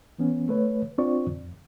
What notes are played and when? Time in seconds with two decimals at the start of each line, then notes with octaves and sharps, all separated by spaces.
0.18 E3 B3 C#4
0.49 A3 B4 C#5
0.98 C4 D4 F4 C5 D5 C#6
1.27 F2